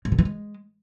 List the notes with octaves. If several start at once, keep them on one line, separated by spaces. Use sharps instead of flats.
G#2
D3
E3
G#3